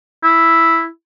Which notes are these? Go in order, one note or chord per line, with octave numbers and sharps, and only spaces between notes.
E4